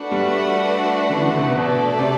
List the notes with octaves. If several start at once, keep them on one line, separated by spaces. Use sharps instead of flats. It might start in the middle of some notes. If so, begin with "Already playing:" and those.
Already playing: A3 D4 F#4 B4 F#5
G3
D3
E3
D3
C3
B2
B2 A3 D4 A4 D5
C3